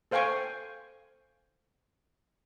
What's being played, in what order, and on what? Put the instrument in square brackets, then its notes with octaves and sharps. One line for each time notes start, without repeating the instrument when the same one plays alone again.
[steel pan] A4 C5 F5 G5 G#5 C#6